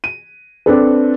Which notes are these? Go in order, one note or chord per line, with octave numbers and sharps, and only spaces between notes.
D#7
C4 D4 A4 B4